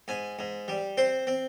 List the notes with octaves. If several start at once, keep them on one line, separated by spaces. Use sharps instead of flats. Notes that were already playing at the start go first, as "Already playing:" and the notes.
G#2 G#5
G#2
G3
C4 C5
C4